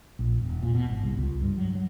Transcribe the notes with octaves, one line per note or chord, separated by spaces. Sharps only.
A#1
E1
A#2
B2
G#1
C2
C#2
G2
F#3
F#3